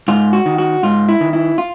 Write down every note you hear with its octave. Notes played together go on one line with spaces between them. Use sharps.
G#2 F4
F#4
D#3
F#4
G#2 F4
E4
D#3
E4
F4